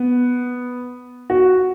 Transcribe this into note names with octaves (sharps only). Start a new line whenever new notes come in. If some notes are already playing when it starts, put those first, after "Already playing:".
Already playing: B3
F#4